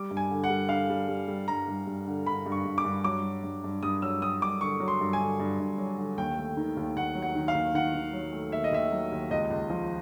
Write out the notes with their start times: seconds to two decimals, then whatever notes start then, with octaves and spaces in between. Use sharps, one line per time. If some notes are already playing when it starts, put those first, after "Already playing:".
Already playing: G3 D6
0.11 G2
0.17 G#5
0.30 D3
0.44 F#5
0.50 G3
0.69 D3 F5
0.90 G3
1.08 G3
1.28 G3
1.48 G2 A#5
1.68 G2
1.87 G2
2.07 D3
2.26 G2 B5
2.46 G2
2.52 C#6
2.65 G2
2.78 D6
2.85 G2
3.04 F#3 D6
3.23 F#3
3.43 G2
3.64 G2
3.82 G2 D#6
4.02 F#3 E6
4.21 F#3 D#6
4.42 G2 D6
4.61 D3 C#6
4.80 F#3
4.88 C6
5.01 G2
5.13 G#5
5.21 D3
5.40 G2
5.60 G2
5.78 F#3
5.98 D3
6.18 D#2 G5
6.37 A3
6.57 D#3
6.77 D#2
6.96 D#2 F#5
7.15 F#3
7.22 F#5
7.35 D#3
7.48 F5
7.54 D#2
7.74 D#3 F#5
7.94 D#3
8.13 F#3
8.33 A3
8.52 D#2 E5
8.64 D#5
8.72 D#2 E5
8.92 F#3
9.12 D#2
9.31 C#2 D#5
9.51 C#2
9.70 F3